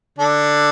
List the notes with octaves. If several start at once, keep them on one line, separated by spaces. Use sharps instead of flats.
D3 D4